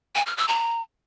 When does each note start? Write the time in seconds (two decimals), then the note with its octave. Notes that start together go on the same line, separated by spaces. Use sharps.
0.15 G#5
0.26 F6
0.37 E6
0.48 A#5